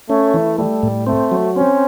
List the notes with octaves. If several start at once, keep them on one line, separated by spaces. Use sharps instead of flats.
A3 C#4
E3
G3 A3
A2
A3 C4
F#3
C4 C#4